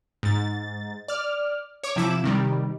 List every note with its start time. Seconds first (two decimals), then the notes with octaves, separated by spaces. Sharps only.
0.23 G#2 A6
1.08 D5 F6
1.83 C#5 D6
1.96 C3 F3 E4 D6 E7
2.24 C3 D#3 G3